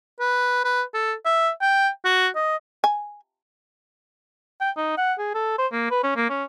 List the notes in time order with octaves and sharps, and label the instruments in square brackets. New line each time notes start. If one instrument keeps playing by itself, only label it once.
[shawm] B4
B4
A4
E5
G5
F#4
D#5
[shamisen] G#5
[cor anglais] G5
D#4
F#5
G#4
A4
C5
A#3
B4
C#4
A#3
C#4